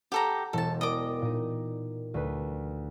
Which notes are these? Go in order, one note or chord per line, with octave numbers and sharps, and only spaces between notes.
G4 A4 F#5 A#5
E1 A4 A5
A#4 D5 D#5 G5 D6
A#2 D#4
D2 B4